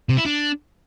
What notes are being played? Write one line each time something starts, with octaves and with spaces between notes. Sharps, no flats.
C3
E4
D4